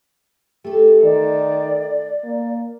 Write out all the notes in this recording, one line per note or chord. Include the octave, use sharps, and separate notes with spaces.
A3 G4 A4
D#3 D5
A#3